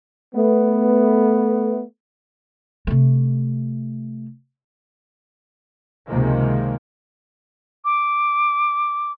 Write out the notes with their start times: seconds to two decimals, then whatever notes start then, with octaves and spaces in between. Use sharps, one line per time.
0.34 A3 B3
2.87 C3 A3
6.08 C#2 C3 D#3 F3 G#3 A#3
7.85 D6